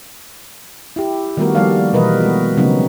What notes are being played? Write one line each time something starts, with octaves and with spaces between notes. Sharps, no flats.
E4 G4
D#3 G3 A3 B3 F#4 A#4
F3 G3 A#3 A4 D5 F5
B2 E3 G3 A#4 B4 D#5
G#3 F#4
C#3 F#3 A3 B3 C4 D#4